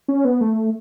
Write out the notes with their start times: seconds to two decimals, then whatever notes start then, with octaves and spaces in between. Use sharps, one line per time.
0.08 C#4
0.25 B3
0.41 A3